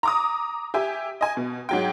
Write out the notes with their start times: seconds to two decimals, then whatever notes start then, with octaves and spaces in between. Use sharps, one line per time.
0.03 A#5 D6 D#6
0.74 G4 E5 G#5
1.21 D#5 G#5
1.37 B2
1.69 G#2 F#3 G5